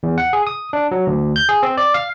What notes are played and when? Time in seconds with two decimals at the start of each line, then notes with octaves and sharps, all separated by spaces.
0.03 E2
0.18 F#5
0.33 G#4
0.47 D#6
0.73 D4
0.91 F#3
1.07 D2
1.36 G6
1.49 G#4
1.63 C4
1.77 D5
1.94 F5